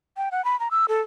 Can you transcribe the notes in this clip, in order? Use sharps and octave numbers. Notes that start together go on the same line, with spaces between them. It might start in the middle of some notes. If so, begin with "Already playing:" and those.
G5
F#5
B5
A#5
E6
A4